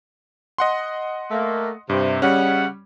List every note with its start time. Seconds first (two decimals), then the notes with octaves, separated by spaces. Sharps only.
0.58 D#5 F#5 C6
1.31 A3 A#3
1.90 G2 C3
2.22 C#3 G3 C#4 D#5 F#5